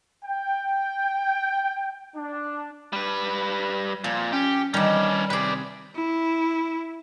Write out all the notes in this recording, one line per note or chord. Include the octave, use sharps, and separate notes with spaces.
G5
D4
G3 B4
A#2 F3
C#4 G4
D#3 E3 G3 C#4 D4
C3 G#4 B4 D5
E4